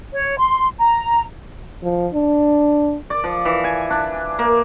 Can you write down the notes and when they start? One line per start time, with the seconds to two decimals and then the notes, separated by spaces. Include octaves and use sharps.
0.13 C#5
0.39 C6
0.78 A#5
1.83 F3
2.13 D4
3.10 D5
3.24 F3
3.45 E3
3.64 G#5
3.90 D4
4.39 A#3